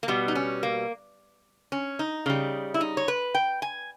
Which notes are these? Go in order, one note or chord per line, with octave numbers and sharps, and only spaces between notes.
A#3
B2 G3 B3
D#4
C#4
A#3
C#4
D#4
C#3 G3
E4
D#4
C#5
B4
G5
G#5